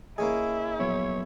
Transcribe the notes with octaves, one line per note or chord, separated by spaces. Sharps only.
A#3 C#4 E4 G#4 D#5
A#1 F#3 B3 C#5